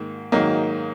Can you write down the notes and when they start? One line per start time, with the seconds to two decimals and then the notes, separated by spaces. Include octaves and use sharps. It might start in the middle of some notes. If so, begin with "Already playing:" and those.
Already playing: G#2 D#3 A#3
0.32 G#2 D#3 F#3 A#3 D#4